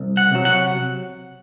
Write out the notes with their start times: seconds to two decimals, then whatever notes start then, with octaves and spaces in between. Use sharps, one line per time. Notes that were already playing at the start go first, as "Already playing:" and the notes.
Already playing: C2
0.17 F#5
0.31 C3 F#3
0.45 F#5